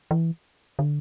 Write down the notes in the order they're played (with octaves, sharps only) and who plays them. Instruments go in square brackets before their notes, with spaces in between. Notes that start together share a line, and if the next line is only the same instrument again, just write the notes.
[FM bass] E3
D3